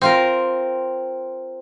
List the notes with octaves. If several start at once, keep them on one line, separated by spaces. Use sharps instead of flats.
C4 F4 A#4